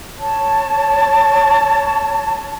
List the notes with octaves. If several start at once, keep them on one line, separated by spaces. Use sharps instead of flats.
C#5 A5